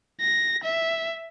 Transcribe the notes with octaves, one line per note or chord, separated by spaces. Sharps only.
A#6
E5